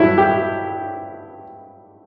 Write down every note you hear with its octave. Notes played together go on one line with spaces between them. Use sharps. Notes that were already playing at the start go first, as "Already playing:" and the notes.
Already playing: G2 F#3 E4
G4